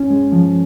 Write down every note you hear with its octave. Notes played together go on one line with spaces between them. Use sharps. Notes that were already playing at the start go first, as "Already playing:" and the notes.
Already playing: C#4
G#3
F3